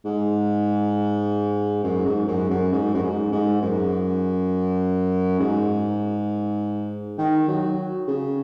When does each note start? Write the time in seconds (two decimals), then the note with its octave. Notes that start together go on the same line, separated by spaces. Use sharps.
0.05 G#2
1.84 F#2
2.05 G#2
2.27 F#2
2.50 F#2
2.72 G#2
2.94 F#2
3.02 G#2
3.32 G#2
3.62 F#2
5.39 G#2
7.18 D#3
7.48 F#3
8.07 C#3